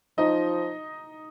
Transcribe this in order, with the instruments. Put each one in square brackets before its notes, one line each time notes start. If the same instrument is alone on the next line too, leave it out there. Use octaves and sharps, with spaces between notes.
[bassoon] F3 [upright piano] D#4 D#5